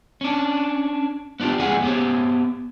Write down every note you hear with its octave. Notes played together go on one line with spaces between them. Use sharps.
C#4 D4
B3 C#4 D4 F4 G4
F2 G#3 G#4 F#5 G#5
B3 G4 C5 C#5